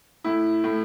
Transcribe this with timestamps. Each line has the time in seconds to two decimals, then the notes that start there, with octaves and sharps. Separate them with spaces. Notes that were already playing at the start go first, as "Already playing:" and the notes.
0.24 A2 E4
0.64 A2